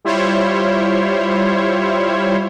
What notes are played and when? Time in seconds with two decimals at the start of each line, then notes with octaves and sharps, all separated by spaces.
0.05 G3 E4 F4 C5 C#5